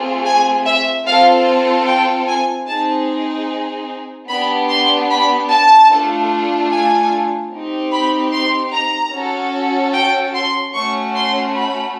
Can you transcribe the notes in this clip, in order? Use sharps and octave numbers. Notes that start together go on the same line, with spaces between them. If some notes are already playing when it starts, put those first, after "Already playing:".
Already playing: A3 C4 F4 G#4
G#5
E5
C4 F4 A4 F5
G5
G#5
C4 D#4 G#4 A5
B3 D4 G4 B5
C6
B5
A5
A3 D4 F4 A4
G#5
C4 D#4 G4
B5
C6
A#5
C#4 F#4 A4
G5
C6
A3 C#4 F#4 C#6
C6
B5